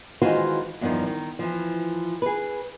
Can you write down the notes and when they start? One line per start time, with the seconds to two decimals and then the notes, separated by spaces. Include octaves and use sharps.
0.22 D#3 E3 G#3 F4 F#4 C5
0.81 E2 G2 C3 D#3 F3
1.06 D#3
1.39 E3 F3
2.22 G#4 B4